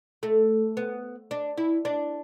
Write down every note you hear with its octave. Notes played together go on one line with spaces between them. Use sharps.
A3
B3
D4
E4
D4